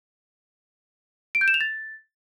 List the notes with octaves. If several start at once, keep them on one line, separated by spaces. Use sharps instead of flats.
D7
G6
E7
F7
A6